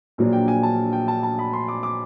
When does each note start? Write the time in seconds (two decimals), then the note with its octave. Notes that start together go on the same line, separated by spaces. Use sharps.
0.18 A#1 A#2 F#3 A#3 D4
0.33 G5
0.48 G#5
0.63 A5
0.93 G5
1.08 A5
1.23 A5
1.39 B5
1.53 C6
1.68 D6
1.83 D6